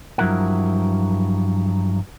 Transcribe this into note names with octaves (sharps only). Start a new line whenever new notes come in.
G2 F3 F#3 E4 A#4 F#5